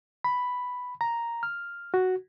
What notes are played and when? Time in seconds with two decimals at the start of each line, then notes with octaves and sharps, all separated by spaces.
0.24 B5
1.01 A#5
1.43 F6
1.94 F#4